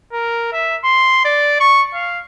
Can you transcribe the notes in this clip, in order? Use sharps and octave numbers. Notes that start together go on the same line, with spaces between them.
A#4
E5
C6
D5
C#6
F5